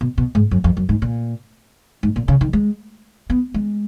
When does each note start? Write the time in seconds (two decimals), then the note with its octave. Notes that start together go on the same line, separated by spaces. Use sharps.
0.01 B2
0.18 B2
0.35 G#2
0.51 F#2
0.64 F2
0.77 F#2
0.89 G#2
1.02 A#2
2.03 G#2
2.16 A#2
2.28 C#3
2.41 D#3
2.53 G#3
3.30 B3
3.54 G#3